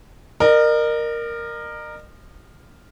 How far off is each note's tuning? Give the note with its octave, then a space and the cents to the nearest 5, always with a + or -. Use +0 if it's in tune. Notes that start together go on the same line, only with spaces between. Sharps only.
A#4 +0 D#5 -45